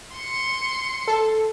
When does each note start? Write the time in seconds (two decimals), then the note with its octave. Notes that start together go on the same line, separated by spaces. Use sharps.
0.14 C6 C#7
1.07 A4